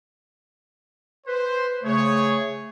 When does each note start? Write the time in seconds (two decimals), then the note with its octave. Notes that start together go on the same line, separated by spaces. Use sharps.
1.27 B4 C5
1.84 C#3 A3 G#4 C#5